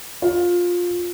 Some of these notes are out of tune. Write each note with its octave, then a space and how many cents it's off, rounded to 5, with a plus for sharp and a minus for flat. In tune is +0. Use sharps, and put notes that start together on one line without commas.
F4 +15